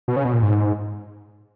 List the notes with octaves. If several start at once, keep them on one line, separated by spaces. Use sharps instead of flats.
B2
C#3
B2
A#2
G#2